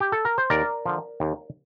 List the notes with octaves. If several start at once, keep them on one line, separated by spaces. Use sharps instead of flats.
G4
A4
A#4
C5
D#2 A#4 D5
D3 F3
D#2